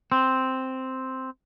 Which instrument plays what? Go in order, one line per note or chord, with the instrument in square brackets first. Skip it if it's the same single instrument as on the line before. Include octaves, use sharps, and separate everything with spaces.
[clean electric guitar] C4